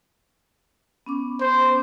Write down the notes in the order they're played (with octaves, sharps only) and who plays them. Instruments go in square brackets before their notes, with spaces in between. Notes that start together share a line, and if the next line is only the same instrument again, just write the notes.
[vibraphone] B3 C#4 D6
[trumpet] C5